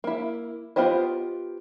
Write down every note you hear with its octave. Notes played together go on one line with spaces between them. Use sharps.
A#3 E4
B3 F4 G4 C5 D#5